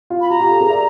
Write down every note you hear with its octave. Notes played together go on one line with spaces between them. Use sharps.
F4
B5
F#4 A#5
F4 G4
G4 A4
G#4 A#4
D5 E5